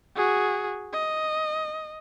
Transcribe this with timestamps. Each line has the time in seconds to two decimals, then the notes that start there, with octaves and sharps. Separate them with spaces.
0.16 F#4 G#4
0.93 D#5